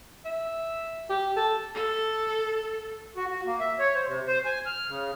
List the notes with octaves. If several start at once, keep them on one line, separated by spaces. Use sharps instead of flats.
E5
G4
A4
A4
F#4
F#4
A#3
E5
C#5
C5
C3
C5
G#5
F6
C#3